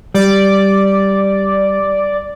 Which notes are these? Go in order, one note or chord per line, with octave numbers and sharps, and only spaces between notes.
G3 D5